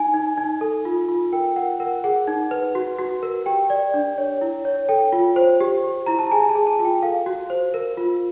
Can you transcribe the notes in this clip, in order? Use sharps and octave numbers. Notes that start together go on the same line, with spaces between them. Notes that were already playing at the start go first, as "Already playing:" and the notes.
Already playing: D#4 G#5
D#4
D#4
A4
F4
F4
A#4 G5
A#4 F#5
A#4 F#5
G#4 F#5
D#4
B4
F#4
F#4
A#4
G4 G5
D5
D4
C#5
E4
C#5
A4 G5
F4
C5
G4
G4
E4 A#5
A5
G#4 G#5
A5
G#4
A5
F4
G5
A4 F5
F#4
C5
A#4
F4